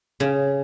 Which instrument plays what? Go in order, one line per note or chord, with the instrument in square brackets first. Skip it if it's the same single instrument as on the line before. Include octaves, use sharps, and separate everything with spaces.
[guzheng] C#3